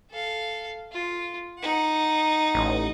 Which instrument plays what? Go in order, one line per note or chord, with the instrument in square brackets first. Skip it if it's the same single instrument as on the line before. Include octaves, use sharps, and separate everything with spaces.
[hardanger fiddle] A4 F5
F4
D#4 F#5
[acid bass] A1